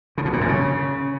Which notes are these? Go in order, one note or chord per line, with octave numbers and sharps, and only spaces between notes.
C#3
B2
A#2
F#2
C#3